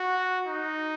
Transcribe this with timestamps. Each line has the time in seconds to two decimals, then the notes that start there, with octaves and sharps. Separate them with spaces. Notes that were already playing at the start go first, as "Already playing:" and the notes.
Already playing: F#4
0.47 D#4